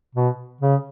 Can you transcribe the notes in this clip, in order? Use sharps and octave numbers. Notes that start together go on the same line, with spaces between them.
B2
C#3